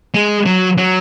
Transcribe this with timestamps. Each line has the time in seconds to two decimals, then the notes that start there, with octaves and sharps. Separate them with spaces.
0.14 G#3
0.46 F#3
0.78 F#3